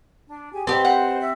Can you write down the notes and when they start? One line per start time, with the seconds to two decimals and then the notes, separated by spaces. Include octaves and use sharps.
0.28 D4
0.52 G4 G#4 G#5
0.67 C4 G4 B4 C5 D#5 A5
0.85 F#5
1.21 E5 E6